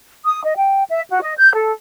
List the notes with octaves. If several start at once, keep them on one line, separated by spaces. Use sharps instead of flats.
D#6
D#5
G5
E5
F#4
D#5
G6
A4